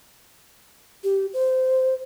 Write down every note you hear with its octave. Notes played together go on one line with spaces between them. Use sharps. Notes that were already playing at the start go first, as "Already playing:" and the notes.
G4
C5